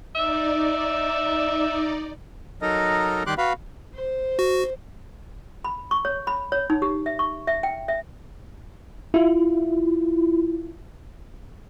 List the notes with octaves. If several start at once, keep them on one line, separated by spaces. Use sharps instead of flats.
D#4 D5 E5
F#3 D#4 A4 A#4 D#5
D#3 G3 G4 C6 D6 F#6
F#4 B4 F5 B5
C5
F#4
B5
C#6
C#5
B5
C#5
D#4
G4
E5
C#6
E5
G5
E5
E4 F4